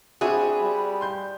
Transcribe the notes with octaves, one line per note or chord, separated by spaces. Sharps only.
C4 D4 F#4 G#4 E5 B5
G3
C6 G6